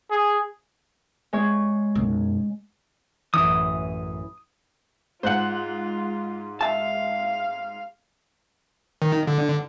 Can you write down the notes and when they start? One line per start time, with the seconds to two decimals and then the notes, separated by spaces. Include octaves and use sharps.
0.11 G#4
1.33 G#3 C#5
1.95 B1 F#2
3.34 A1 F#2 E3 D#6
5.23 G#2 F4 C5 F#5 F#6 F#7
6.61 E5 F5 A5
9.02 D#3
9.27 D3